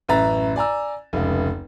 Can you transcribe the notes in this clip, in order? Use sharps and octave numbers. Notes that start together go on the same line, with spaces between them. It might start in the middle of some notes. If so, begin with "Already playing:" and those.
A1 F#2 B4 E5 A#5 A6
D5 G#5 A#5 E6
F1 C#2